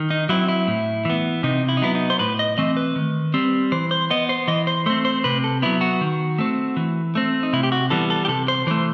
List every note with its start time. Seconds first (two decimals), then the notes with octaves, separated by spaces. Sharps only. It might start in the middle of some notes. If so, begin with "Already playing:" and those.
Already playing: D#3
0.10 D#4
0.29 F#3 C4 E4
0.49 E4
0.68 A2
1.05 E3 B3
1.43 C3 D#4
1.69 E4
1.77 D#4
1.82 F#3 B3 E4
1.95 D#4
2.10 C5
2.19 A2 B4
2.39 D#5
2.58 E3 A3 C4 D#5
2.77 B4
2.96 D#3
3.34 G3 C4
3.72 E3 C5
3.91 C5
4.11 B3 D#5
4.29 C5
4.48 E3 D#5
4.67 C5
4.86 A3 C4 C5
5.05 C5
5.24 C3 B4
5.44 A4
5.62 F#3 B3 E4
5.81 F#4
6.01 D#3
6.39 A3 C4
6.77 E3
7.15 A3 C4
7.43 D#4
7.53 C3 E4
7.63 G4
7.72 F#4
7.90 E3 G3 B3 A4
8.10 A4
8.25 G4
8.28 C3 A4
8.48 C5
8.67 E3 A3 C5